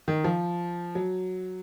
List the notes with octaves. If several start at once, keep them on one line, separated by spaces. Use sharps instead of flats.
D#3
F3
F#3